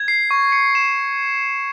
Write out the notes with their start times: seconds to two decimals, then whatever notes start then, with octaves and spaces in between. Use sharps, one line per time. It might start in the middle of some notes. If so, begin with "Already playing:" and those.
Already playing: G#6
0.08 C7
0.31 C#6
0.52 C#7
0.75 E7